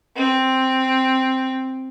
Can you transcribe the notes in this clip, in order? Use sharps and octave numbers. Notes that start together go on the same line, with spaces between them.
C4